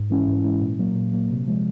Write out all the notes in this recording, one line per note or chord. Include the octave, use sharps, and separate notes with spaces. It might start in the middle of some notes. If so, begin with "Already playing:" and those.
Already playing: G#2
E3 G#3 C#4 E4
G#2
E3 G#3 C#4 E4
A#2
F#3 A#3
A#2
F#3 A#3
C3
F3 G#3